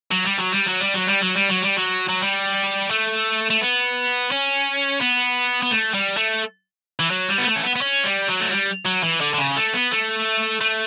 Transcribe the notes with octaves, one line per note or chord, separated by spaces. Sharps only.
F#3
G3
F#3
G3
F#3
G3
F#3
G3
F#3
G3
F#3
G3
F#3
F#3
G3
A3
A3
B3
C#4
B3
B3
A3
G3
A3
E3
F#3
G3
B3
A3
C#4
B3
B3
C#4
G3
F#3
A3
G3
F#3
E3
D3
D3
C#3
A3
B3
A3
A3